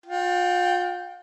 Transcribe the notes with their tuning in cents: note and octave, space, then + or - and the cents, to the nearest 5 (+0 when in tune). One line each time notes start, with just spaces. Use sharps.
F4 +35 G5 -10